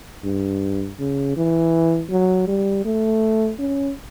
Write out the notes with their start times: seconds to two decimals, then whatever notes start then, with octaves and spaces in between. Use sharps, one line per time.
0.24 G2
0.99 C#3
1.36 E3
2.10 F#3
2.47 G3
2.85 A3
3.59 C#4